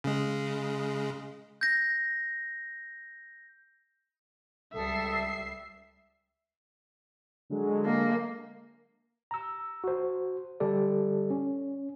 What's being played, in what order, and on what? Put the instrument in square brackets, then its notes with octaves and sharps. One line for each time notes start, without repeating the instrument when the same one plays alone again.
[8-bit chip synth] C#3 G#3
[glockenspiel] G6 A#6
[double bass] C#2 G3 [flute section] A4 D#6 [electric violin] E5 [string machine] C7
[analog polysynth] D3 F#3 G#3
[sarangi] A#3
[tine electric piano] A#5 E6
F#4 C5
D3 G3 G4 A4 D5
C#4